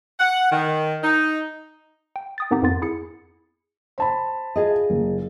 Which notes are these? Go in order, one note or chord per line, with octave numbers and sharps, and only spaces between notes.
F#5
D#3
D#4
G5
G5 D#6 A6
G#2 D#3 B3 C4 D#4 G4
F2 G#2 D#3 B3 F4 A6
E4 G#4 C#7
C5 A5 B5
F4 G#4 D#5
F#1